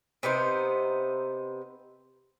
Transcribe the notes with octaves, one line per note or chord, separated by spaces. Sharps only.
C3 B3 D#4 C5